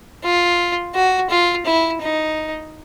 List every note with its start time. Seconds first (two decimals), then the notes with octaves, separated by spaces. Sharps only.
0.24 F4
0.95 F#4
1.30 F4
1.66 E4
2.01 D#4